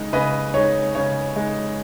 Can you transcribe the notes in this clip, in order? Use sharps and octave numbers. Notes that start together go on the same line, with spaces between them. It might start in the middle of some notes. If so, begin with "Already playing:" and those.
Already playing: C#3 G#3 D#4
C#3 B4 D#5
G#3 D#4 C#5
C#3 C#5
G#3 D#4